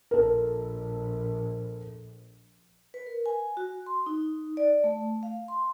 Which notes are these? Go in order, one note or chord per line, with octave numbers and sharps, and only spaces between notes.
A#1 A4 A#4
B4
A#4
G#5
F#4
C6
D#4
D5
A3
F5
C6